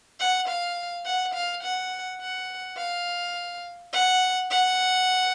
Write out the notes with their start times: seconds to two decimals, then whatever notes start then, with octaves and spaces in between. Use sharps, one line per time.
0.20 F#5
0.48 F5
1.06 F#5
1.34 F5
1.63 F#5
2.21 F#5
2.78 F5
3.93 F#5
4.50 F#5